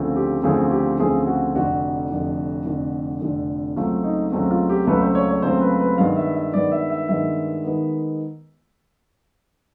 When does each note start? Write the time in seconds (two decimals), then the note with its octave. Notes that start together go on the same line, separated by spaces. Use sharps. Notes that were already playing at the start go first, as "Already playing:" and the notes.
Already playing: D2 C#3 F3 A3 C4
0.16 G4
0.44 D2 C#3 F3 A3 C4 G#4
0.71 G4
1.00 D2 C#3 F3 A3 C4 G#4
1.27 F#4
1.55 F1 F2 D3 F#4
2.10 F1 F2 D3
2.66 F1 F2 D3
3.21 F1 F2 D3
3.76 C#2 C#3 F#3 A3 C4 F4
4.04 D#4
4.32 C#2 C#3 F#3 A3 C4
4.51 F4
4.69 G4
4.87 C#2 C#3 F#3 A3 C4 B4
5.02 C5
5.15 C#5
5.29 C#5
5.42 C#2 C#3 F#3 A3 C4 C5
5.61 B4
5.80 B4
5.98 G2 D#3 G#3 B3 F5
6.16 E5
6.35 E5
6.53 G2 D#3 G#3 B3 D5
6.72 E5
6.90 E5
7.08 G2 D#3 G#3 B3 E5
7.64 D#3 G#3 B3